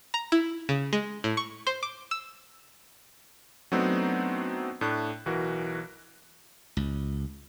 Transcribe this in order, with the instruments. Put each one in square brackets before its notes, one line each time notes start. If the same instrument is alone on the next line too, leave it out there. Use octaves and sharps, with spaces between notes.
[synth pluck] A#5
E4
C#3
G#3
A2
C#6
C5
D6
E6
[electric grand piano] F#3 A3 B3 C4 D4 D#4
A2 A3 D4 F#6
B1 E3 F#4 A#4
[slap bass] C#2